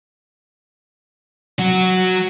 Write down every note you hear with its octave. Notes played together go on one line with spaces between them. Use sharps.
F#3 F#4